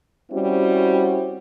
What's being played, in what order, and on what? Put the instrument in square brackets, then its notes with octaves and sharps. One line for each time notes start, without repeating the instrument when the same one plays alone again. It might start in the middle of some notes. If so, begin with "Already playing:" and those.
[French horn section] G3 C4 C#4 E4 F#4